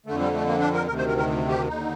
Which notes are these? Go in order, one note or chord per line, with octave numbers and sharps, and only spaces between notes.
F2 D3 A3
G3
A3
A#3
D4
A#4
D2 C3 D#3 A#4
C5
A#4
A#4
G4
D#2 D3 D#4